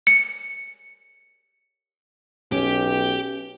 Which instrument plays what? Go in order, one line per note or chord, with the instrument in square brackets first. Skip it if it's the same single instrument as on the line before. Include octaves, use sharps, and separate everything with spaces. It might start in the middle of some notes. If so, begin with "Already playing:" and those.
[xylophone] C#7
[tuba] B1 [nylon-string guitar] C#4 [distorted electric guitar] G4